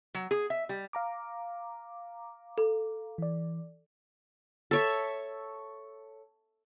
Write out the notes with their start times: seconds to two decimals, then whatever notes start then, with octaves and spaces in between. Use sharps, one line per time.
0.15 F#3
0.31 G#4
0.50 E5
0.69 G3
0.93 F5 A#5 D6
2.58 A4
3.18 E3 D5
4.71 A4 C#5 E5